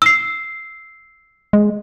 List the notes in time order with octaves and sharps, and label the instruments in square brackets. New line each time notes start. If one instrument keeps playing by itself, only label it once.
[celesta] E6 C7
[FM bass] G#3